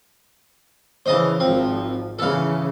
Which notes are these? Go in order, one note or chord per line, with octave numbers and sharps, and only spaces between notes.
C#3 E3 C5 D#5 A5
G#1 F3 C4
C#3 E3 A4 F5